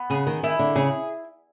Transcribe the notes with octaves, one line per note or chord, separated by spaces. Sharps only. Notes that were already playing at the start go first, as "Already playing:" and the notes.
Already playing: B3
C#3 G#4
D#3
D#3 E4
D3
C#3 G#4